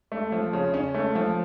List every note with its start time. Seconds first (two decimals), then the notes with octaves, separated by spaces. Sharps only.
0.12 A3
0.32 F3
0.53 C#3
0.74 C#4
0.94 A3
1.15 F3